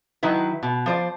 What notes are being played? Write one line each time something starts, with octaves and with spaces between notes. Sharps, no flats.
D#3 F#3 E4 B4
B2
F3 C5 D5